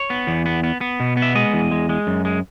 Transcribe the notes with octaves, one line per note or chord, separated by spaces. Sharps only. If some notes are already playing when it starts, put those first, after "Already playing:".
Already playing: C#5
B3
E2
B3
B3
B3
B2
B3
E5
G#3 D#5
E2
G#3
G#3
F#2
G#3